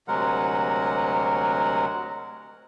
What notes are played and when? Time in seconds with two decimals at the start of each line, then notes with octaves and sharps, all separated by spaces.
0.08 D2 C3 F#3 G#3 A#4 F#5